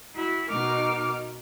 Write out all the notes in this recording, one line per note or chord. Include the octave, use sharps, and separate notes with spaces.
E4 F#4
B2 D#4 A#4 D6 F6